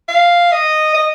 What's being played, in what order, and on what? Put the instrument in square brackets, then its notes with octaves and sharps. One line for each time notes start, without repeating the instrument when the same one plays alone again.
[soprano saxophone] F5
D#5
D#5